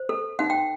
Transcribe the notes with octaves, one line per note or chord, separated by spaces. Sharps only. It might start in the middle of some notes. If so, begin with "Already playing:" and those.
Already playing: C5
A4
D#4 F#5
G5